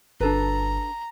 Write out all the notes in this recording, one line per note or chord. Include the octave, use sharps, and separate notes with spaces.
G1 D4 A4 B4 A#5